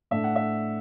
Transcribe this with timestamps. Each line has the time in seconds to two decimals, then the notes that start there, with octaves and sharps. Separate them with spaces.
0.11 A2 A3 D4 E5
0.24 F#5
0.36 E5